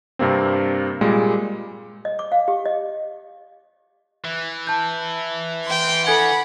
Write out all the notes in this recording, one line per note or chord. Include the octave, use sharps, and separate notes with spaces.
G2 C3 A#3 C4
A#2 G3 G#3
D#5
D6
F5
G4
D#5
E3
A5 G6
G5 C6
A4 F#5 G#5 B5 G#6